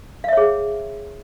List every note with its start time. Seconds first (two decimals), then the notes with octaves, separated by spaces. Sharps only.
0.24 F5
0.28 E5
0.33 C#5
0.37 G#4